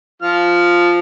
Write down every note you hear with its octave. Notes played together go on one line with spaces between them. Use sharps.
F3 F4 F6